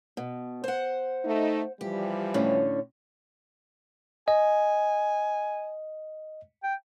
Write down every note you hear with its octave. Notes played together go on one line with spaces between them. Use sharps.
B2
C5 F#5
A3 D#4
E3 F3 G3 G4
A2 D3 C#4
D#5 G#5
G5